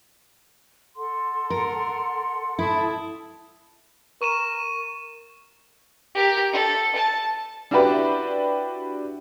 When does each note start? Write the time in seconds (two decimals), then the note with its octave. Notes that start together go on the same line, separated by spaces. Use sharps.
0.97 A4 F#5 C6
1.50 A#4
2.59 E4 A4 A5 D#6
4.22 A#4 C#6 D#7 E7
6.15 G4 A#4
6.52 A4
6.95 A5
7.71 D4 E4 F#4 G4 B4 D5